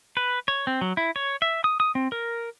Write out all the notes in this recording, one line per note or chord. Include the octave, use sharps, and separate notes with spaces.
B4
C#5
C4
F#3
E4
C#5
E5
D#6
D#6
C4
A#4